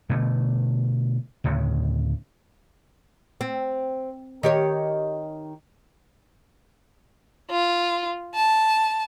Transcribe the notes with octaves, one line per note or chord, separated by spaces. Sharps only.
B2 D3 A3
D2 A2 C#3
C4
D#3 G4 C#5
F4
A5